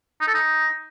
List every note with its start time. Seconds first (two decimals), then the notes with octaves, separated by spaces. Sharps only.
0.21 D#4
0.28 A4
0.34 D#4